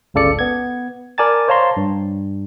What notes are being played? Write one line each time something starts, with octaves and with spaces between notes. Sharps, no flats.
G1 C#2 C#3 A4 D5 C#7
B3 G#6
A#4 D5 G#5 A5 A6
C5 C#5 F5 A5 A#5 C6
G2